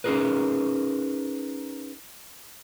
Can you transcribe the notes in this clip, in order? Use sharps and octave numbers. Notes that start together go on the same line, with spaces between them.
C#4 D#4 G4 G#4 A#4 B4